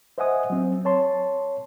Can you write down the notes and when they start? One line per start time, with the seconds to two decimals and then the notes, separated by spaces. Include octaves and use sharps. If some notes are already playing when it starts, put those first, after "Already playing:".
0.18 C5 D#5 E5 F#5 G#5 D#6
0.50 F#3 C4
0.85 C#5 A5 C6